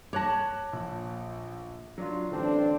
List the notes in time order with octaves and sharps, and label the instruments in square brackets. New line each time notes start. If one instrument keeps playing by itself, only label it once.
[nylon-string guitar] C#5 A5 [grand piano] D6 F#6 A#6
[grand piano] A#1
F#3 D4 F4
[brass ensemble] A1 C4 D4 [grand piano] D3